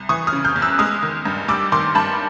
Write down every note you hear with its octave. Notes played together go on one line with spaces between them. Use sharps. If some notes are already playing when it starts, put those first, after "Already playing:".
Already playing: C2
E3 C#6 D#6
D#6 F6
C#3
F6 G6
E2
E6 F#6
G#3 D#6 F6
D#3
G2
G3 D6 E6
D#3 C6 D6
G2 A5 B5